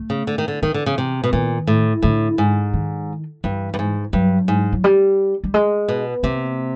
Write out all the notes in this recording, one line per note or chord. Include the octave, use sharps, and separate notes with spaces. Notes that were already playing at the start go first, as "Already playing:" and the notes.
Already playing: A3
C#3
D3
D#3
D3
D#3 E3
D3
C#3
C3
B2
A#2 D#3
A2
A2 D3
G#2
D#3
G2 E3
G2
G#2
G2 F#3
G#2
F#3
G3
G3
G#3
B2
C3 A#3